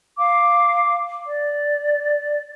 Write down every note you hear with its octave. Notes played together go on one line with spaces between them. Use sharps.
F5 D6
D5